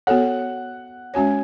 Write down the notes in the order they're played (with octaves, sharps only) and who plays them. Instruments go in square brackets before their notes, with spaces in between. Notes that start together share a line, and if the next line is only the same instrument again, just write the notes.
[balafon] B3 F#4 A4 C#5 [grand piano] F#5
[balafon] G#3 C#4 F#4 C#5 [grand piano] G#5